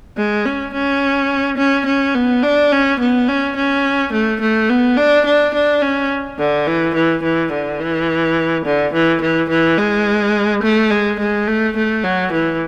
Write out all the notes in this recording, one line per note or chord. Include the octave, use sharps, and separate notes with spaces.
G#3
C#4
C#4
C#4
C#4
B3
D4
C#4
B3
C#4
C#4
A3
A3
B3
D4
D4
D4
C#4
D3
E3
E3
E3
D3
E3
D3
E3
E3
E3
G#3
A3
G#3
G#3
A3
A3
F#3
E3